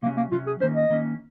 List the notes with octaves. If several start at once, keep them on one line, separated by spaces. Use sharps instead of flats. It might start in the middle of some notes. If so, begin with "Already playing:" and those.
C3 F#3 A#3 C#4
A#3
C3 F#3 C#4 F4
G#4
D#3 A#3 C#4 C5
D#5
D#3 A#3 C#4